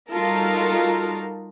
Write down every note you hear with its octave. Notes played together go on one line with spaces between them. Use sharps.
G3 D#4 F4 F#4 A4 A#4